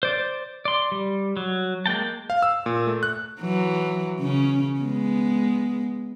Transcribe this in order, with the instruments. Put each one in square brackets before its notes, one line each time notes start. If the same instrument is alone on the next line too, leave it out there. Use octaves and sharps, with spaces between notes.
[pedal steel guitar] C5 D5
D5 C6
G3
F#3
G#3 A#3 G5 A5
[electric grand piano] F5
E6
A#2
A3
F#6
[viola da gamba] E3 F#3
C#3 C#4
G#3 B3